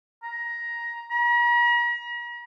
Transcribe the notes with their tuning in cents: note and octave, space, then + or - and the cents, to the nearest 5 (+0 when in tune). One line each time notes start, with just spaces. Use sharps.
A#5 +15
A#5 +45